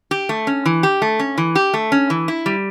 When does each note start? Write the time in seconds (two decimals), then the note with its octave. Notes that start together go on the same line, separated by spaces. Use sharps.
0.11 G4
0.29 A3
0.47 C#4
0.66 E3
0.83 G4
1.02 A3
1.19 C#4
1.38 E3
1.55 G4
1.74 A3
1.92 C#4
2.10 E3
2.28 E4
2.46 G3